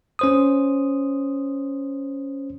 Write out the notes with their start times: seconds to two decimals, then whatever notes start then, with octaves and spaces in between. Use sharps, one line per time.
0.19 C#4 C5 D#6